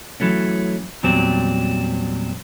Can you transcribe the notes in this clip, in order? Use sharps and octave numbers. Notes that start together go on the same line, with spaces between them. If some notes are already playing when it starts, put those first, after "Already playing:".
E3 F#3 A3 C#4
E2 A#2 F#3 G3 C4